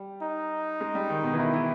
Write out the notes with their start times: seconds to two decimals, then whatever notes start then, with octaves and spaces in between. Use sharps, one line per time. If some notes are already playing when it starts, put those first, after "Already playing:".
Already playing: G3
0.22 D#4
0.81 G#3
0.95 G3
1.09 D#3
1.23 B2
1.33 E3
1.38 D#3 E4
1.54 E3